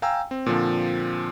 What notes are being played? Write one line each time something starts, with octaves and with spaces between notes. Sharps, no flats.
F5 G5 G#5 A#5 E6
C4
A#2 D3 F3 C4